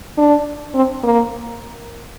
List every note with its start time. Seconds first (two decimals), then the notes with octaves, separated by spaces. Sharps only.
0.17 D4
0.74 C4
1.03 A#3